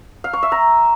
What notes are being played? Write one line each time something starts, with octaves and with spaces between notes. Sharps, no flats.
F5
C#6
E5
A#5